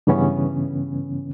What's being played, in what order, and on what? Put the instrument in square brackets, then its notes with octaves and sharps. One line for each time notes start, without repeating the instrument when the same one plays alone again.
[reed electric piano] G2 C#3 E3 B3 C#4